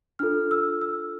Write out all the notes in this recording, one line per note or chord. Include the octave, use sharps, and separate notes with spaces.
D4 F4 A4 F6
E6
E6